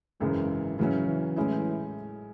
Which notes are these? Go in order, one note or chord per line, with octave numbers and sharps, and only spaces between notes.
G#1 F#2 C#3 E3 G#3
C#3 E3 F#3 C#4
E3
A2 G#3 C#4 E4